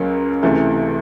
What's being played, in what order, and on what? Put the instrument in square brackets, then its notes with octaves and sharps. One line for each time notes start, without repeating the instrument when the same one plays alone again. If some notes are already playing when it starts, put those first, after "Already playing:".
Already playing: [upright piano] C#2 C#3 F#3 A#3
C#2 C3 E3 A3